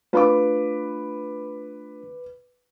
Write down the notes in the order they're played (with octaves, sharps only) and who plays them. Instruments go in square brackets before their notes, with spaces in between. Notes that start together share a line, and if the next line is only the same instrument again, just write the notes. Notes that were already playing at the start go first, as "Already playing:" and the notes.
[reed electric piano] A3 D4 F4 [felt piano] B4 B5 D6